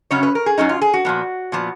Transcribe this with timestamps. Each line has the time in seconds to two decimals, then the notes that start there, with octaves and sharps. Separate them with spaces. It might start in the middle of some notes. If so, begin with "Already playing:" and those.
0.11 F#2 C#3 F#3 C#4 C#5
0.23 B4
0.35 A#4
0.46 G#4
0.58 F#2 C#3 F#3 C#4 D#4
0.69 F4
0.81 G#4
0.94 F#4
1.05 A#2 F3 B3
1.52 A#2 F3 B3